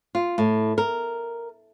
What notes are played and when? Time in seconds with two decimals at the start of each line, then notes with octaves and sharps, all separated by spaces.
0.15 F4
0.38 A2
0.78 A#4